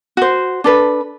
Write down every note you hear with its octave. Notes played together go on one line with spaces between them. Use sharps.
F#4 C5
D4 A4 B4